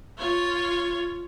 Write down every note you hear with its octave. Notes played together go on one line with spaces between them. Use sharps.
F4 C#5